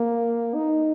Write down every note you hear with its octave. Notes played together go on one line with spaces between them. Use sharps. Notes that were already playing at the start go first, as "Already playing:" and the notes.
Already playing: A#3
D#4